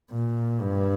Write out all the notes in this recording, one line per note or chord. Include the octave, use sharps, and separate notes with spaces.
A#2
G2